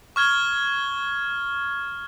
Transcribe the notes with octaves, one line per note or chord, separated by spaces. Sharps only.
C#6 F6 G#6 G7